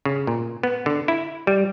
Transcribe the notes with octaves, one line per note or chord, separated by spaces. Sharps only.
C#3
A#2
B3
D3
E4
G3